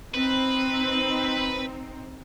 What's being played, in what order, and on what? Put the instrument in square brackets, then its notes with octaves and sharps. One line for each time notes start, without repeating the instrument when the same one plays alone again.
[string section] C4 D#4 [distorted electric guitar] B4